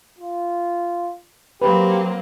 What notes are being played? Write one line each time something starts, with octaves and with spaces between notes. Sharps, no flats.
F4
F#3 A#3 C4 G4 B4